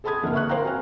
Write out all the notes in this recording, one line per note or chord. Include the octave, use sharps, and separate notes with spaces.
G#4 A4 A5 B5 D#6 G#6
F#1 D2 A#3 B4 E5 F6
C#6 F6 F#6
A#4 C5 F5 G5 A#5
C4 F#4 G#5 F6